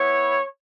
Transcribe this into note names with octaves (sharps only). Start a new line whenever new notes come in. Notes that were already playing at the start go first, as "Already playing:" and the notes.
Already playing: B3 E4 C#5